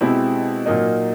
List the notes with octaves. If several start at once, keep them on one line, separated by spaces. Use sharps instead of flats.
B2 G#3 C4 E4 G4
A#2 F#3 A#3 D#4